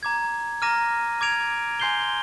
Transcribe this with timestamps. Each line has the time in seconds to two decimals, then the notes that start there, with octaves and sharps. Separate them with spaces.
0.03 A#5 D6 G#6
0.62 A#5 D6 F6 A#6 D#7
1.21 D6 G#6 D7 F7
1.80 G#5 C6 G6 C7 G7